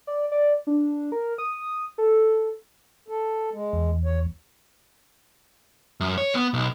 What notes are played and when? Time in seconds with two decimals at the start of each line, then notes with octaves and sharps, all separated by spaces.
0.07 D5
0.32 D5
0.67 D4
1.12 A#4
1.38 D#6
1.98 A4
3.08 A4
3.53 G#3
3.73 E2
4.05 C#5
6.00 F#2
6.18 C#5
6.35 B3
6.54 B1